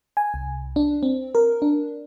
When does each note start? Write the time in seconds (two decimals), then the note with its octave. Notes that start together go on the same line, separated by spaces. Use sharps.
0.17 G#5
0.34 C2
0.76 D4
1.03 C4
1.35 A#4
1.62 D4